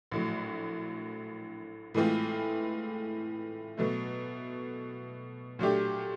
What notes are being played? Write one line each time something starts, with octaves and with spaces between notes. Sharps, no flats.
A#1 A2 F#3
A2 E3 G#3 C4 F4
B2 F#3 A3
A#2 F#3 A3 D4 G4